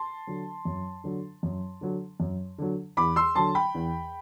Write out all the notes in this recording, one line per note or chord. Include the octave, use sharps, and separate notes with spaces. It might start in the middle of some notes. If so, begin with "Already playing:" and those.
Already playing: A5 C6
D3 F#3
F#2
D3 F#3
F#2
D3 F#3
F#2
D3 F#3
E2 B5 D6
C6 E6
D3 F#3 A5 C6
G5 B5
E2